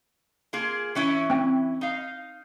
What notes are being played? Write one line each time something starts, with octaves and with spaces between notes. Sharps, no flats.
A#3 F4 G#4
E3 C#4 E4
C4 G5
D#4 F5